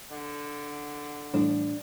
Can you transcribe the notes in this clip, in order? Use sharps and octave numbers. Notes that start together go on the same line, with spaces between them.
D3
A2 E3 G3 D4